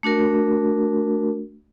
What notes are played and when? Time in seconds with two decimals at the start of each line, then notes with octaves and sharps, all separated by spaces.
0.03 A3 D4 F#4 A#4